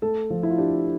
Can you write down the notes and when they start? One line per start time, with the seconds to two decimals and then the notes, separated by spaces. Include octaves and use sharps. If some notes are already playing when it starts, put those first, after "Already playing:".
0.02 A3 A4
0.30 F3
0.43 E4
0.51 F4
0.58 D4 G4